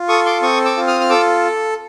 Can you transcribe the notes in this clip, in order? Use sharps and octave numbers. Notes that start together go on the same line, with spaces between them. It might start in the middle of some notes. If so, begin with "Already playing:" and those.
Already playing: F4
A4 C#6 D#6
C6 D6
C4 C#6 D#6
D6 E6
F4
D#6 F6
F6
A4 D6 E6